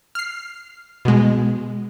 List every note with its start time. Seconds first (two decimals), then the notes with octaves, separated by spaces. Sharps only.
0.15 F6 C7
1.05 B2 G#3